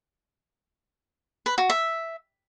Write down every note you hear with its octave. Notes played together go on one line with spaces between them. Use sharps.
B4
F#4
E5